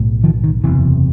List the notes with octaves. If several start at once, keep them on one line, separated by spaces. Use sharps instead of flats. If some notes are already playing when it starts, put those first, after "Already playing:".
Already playing: B1 A2
D#3 F3
D#3
F#1 E2 C3 E3